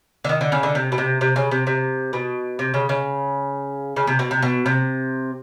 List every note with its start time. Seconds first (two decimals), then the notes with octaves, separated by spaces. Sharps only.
0.25 D3
0.29 D#3
0.41 D3
0.52 C#3
0.63 D3
0.75 C3
0.92 B2
0.98 C3
1.21 C3
1.36 C#3
1.51 C3
1.67 C3
2.13 B2
2.59 C3
2.74 C#3
2.89 C#3
3.96 C#3
4.07 C3
4.19 B2
4.31 C3
4.43 B2
4.66 C3